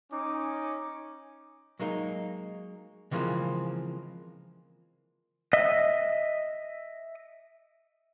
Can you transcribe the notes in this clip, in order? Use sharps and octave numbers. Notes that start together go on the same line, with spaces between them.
C#4 D#4 D6
F#3 G#3 A#3 D#4
C#3 E3 F3 G#3 A#3 C4
D#5 E5